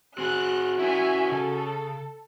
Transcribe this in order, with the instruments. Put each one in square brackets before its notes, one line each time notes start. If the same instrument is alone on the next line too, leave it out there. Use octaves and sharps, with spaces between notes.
[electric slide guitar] C4 G#4 [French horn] F#4 [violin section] F#6
[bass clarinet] C#4 [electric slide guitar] E4 A#4 [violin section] E5 G#5
[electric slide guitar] C#3 [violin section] A4